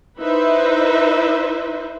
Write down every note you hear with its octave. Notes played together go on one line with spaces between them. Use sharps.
D#4 E4 B4 C5 E5